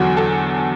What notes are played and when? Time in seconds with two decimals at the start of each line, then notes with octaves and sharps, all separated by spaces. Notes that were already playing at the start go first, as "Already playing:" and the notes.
Already playing: E2 D3 F#3 F#4
0.17 A4